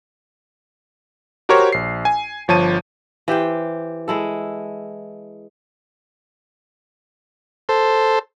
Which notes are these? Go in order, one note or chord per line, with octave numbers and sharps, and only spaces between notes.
F#4 G4 A#4 C5 C#5
A#1 C7
G#5
G1 F3 C#5 A5 D#7
E3 G4 C5 G5
G#3 E4 A4
A4 C5